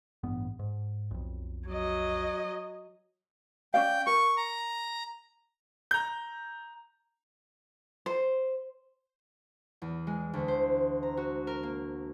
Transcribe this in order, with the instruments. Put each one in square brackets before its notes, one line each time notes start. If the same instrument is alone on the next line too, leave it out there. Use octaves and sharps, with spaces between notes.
[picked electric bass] A1 G2 B3
G#2
B1 F2
[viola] F#3 D#5
[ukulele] C#4 D5 F5 [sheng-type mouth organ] G5
[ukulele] A#4 [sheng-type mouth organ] C#6
[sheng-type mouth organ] A#5
[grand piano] A#5 G6
[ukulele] C5
[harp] E2
G#3
D2
C5
A#5
F#4
A#4
A#3